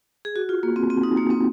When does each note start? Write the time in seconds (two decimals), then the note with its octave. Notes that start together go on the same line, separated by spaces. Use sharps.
0.25 G#4
0.36 F#4
0.49 F4
0.63 A#3
0.76 C4
0.90 C4
1.03 D#4
1.17 A#3
1.30 C4